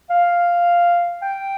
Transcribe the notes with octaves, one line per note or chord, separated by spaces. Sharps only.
F5
G5